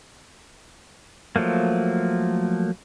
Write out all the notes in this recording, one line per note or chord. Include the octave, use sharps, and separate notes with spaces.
F3 F#3 A3 A#3